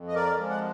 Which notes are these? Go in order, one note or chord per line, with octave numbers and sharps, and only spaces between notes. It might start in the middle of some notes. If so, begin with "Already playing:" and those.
Already playing: F2
D#5
A#4 D5
F3 G#3
F#5